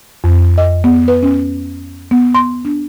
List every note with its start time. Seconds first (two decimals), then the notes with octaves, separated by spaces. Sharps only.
0.24 F2
0.58 D#5
0.84 B3
1.08 B4
1.23 C#4
2.11 B3
2.35 C6
2.65 D4